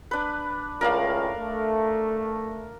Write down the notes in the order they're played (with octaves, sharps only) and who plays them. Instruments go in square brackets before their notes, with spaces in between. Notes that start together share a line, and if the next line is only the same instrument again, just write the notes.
[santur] D4 B4
[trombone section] C#2 A2 G#3 [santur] A#4 D5 F5
[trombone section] A3